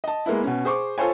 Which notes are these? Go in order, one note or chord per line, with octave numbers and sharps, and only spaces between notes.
D#5 A5
G#3 A#3 B3 E4
B2 C#4
G#4 C5 C#6 D6
F4 A4 C5 C#5 G#5